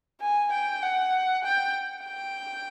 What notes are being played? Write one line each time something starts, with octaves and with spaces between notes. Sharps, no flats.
G#5
G5
F#5
G5
G5